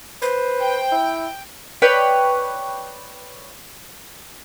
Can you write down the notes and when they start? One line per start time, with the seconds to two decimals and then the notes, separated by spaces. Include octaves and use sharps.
0.22 B4 C5
0.60 G5
0.92 E4
1.82 B4 C#5 D5 G5